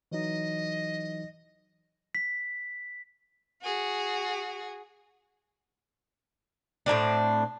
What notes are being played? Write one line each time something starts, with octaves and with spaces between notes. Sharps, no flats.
E3 F#3 D#4 D#5
B6
F#4 G#4
A2 A#3 C4 D4